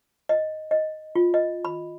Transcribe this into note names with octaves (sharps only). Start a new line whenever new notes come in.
D#5
D#5
F4
D#5
B5